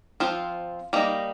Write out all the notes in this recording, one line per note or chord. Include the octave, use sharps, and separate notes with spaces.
F3 C4 F4
G3 A#3 D#4